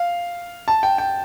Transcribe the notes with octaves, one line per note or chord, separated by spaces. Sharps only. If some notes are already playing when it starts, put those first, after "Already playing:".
Already playing: F5
A5
G5
G5